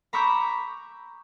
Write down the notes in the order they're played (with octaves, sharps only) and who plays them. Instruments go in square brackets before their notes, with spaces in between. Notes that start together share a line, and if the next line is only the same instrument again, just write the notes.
[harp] A#5 B5 C#6 D6 E6 G6